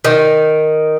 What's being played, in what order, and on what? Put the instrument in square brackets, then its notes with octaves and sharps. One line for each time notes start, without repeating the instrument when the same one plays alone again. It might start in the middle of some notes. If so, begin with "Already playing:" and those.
[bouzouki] D#3